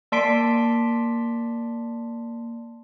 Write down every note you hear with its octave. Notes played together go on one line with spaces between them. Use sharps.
A#3 D5 A5 C6 B6 D7